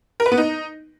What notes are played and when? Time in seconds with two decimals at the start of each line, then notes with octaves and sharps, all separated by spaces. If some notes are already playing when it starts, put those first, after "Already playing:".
0.20 A#4
0.26 B4
0.32 B3
0.38 D#4